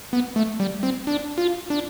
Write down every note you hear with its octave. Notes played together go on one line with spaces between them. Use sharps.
B3
A3
G3
C4
D4
F4
D4